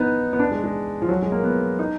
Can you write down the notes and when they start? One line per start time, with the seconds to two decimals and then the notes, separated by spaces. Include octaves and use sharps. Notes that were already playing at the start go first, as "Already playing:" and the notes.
Already playing: B3 D#4
0.33 B3
0.39 D4
0.51 G#3
0.64 G#3
1.02 F3
1.09 F#3
1.22 G#3
1.32 A#3
1.44 B3
1.79 D#4